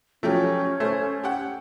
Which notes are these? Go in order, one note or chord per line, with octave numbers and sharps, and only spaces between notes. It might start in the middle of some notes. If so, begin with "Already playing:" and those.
F3 F#3 A3 C#4 G4
A3 C5
G4 F#5